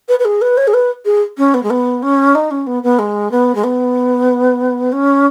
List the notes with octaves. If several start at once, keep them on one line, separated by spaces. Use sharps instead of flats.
B4
B4
G#4
B4
C#5
G#4
B4
G#4
C#4
B3
G#3
B3
C#4
D#4
C#4
B3
B3
G#3
B3
G#3
B3
C#4